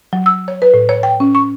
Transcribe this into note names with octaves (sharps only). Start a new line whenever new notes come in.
F#3
E6
C#5
B4
A2
C#5
G5
C#4
C#6